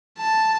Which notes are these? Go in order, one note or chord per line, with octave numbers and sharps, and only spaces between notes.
A5